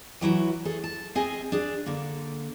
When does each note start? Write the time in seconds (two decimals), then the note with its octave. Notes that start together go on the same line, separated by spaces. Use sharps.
0.21 E3 F#3 E4 F#4
0.65 G#4 A4
0.84 A5
1.15 C4 G#4 D#5 G#5
1.52 D4 G#4
1.86 D3 A#3